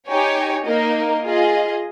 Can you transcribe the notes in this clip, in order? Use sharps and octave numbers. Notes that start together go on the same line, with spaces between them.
D#4 G4 C#5 G#5
A#3 D#4 A#4 D#5
F4 G#4 D#5